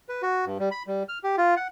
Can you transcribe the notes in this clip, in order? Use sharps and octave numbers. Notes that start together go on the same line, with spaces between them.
B4
F#4
G2
G3
B5
G3
F6
G4
F4
F#5